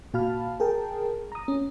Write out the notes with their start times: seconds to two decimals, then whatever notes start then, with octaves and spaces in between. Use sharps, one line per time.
0.14 A#2 F#4 F5 A5 B5 F6
0.60 G#4 A#4 G5 A5
1.32 A#5 D#6
1.48 C#4